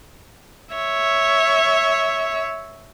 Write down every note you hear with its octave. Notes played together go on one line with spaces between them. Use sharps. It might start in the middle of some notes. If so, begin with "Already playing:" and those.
C#5 E5